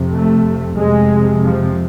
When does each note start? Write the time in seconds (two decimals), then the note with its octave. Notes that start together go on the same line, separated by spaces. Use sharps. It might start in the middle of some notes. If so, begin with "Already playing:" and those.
Already playing: F2 C3
0.14 A3
0.79 F2 C3 G#3
1.44 F3